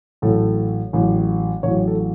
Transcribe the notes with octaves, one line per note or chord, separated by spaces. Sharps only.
A1 A2 F#3 A4
A1 A2 F#3
A1 A2 F#3 C#5
A4